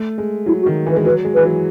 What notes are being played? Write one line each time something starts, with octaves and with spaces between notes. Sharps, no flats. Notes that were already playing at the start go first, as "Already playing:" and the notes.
Already playing: A3
G#3
F#3 E4
F#4
D#3
E3 B4
G#3
F#3 B4
G#3
E3 B4
F#3